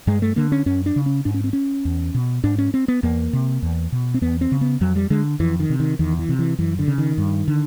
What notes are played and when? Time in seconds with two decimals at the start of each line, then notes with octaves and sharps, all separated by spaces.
0.07 G2 G#3
0.22 A3
0.36 D3 A#3
0.52 C#4
0.66 F#2 C#4
0.86 D4
0.96 C#3
1.06 C#4
1.25 G#2 D4
1.34 C#4
1.44 C4
1.53 C#4
1.85 E2
2.14 B2
2.44 G#2 D4
2.58 C#4
2.74 C4
2.88 B3
3.03 E2 A#3
3.33 C3
3.62 E2
3.92 B2
4.14 C4
4.21 E2 B3
4.41 C4
4.52 C#3
4.61 B3
4.81 F2 F#3
4.96 G3
5.10 D3 G#3
5.40 F2 E3
5.60 D#3
5.70 C3
5.80 D#3
5.99 E2 D#3
6.19 E3
6.29 C3
6.39 E3
6.59 F#2 E3
6.79 D3
6.88 C#3
6.98 D#3
7.18 G2
7.48 D3